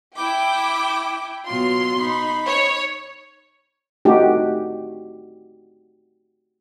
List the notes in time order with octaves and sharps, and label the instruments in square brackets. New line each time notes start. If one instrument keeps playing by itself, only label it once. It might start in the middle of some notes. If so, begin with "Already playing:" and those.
[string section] E4 G5 [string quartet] D6
[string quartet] B2 F#3 F4 [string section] C6
[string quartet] D#4 B5
[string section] C#5
[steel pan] A3 D#4 F#4 G4